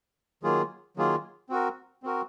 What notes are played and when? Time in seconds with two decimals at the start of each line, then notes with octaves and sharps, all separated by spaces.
0.43 D#3 F#3 A#3 F4 G#4
0.97 D#3 F#3 A#3 F4 G#4
1.50 C4 F#4 A#4
2.03 C4 F#4 A#4